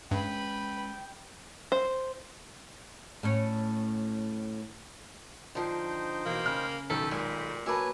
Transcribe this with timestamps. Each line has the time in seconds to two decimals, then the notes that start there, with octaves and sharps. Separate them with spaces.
0.11 G2 G#3 C#4 B4 G5 B5
1.72 C5
3.23 A2 C#4 C#5
5.55 D3 F3 D#4 C5 G5
6.26 B2 E3 A#3
6.46 C#3 F6
6.90 B1 D#3 A4 G5 B5
7.11 A#2 G#3
7.66 F#3 A#3 B4 G#5 A5 D6 E6